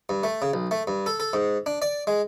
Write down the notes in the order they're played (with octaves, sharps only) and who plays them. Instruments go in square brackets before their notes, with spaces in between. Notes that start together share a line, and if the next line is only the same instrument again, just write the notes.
[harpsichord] G2
A3
C#3
B1
A3
G2
A4
A4
G#2
D4
D5
G#3